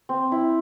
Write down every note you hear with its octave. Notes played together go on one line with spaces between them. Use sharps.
C4
E4